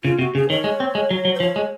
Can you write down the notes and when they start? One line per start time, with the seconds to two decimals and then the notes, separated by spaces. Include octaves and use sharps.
0.04 C#3 F4
0.19 C3 F#4
0.35 C#3 G#4
0.49 D#3 C#5
0.64 G#3
0.80 C4
0.95 G#3
1.11 F#3
1.25 F#3
1.35 C5
1.40 F3 C#5
1.56 G#3